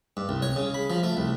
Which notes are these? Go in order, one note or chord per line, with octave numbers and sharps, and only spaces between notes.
G2
C2
C#5
C#3
B5
F3
A3
C2